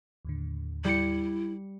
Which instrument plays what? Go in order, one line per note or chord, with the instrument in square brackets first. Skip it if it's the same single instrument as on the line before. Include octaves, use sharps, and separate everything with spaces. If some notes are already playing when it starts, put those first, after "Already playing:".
[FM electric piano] D#2 A2 D3
[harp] G3 C#7 [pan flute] E4